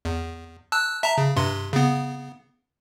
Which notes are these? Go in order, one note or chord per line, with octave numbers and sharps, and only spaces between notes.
E2
A5 E6 F#6
E5 A5 A#5
C#3
G2 C3 C6
C#3 B3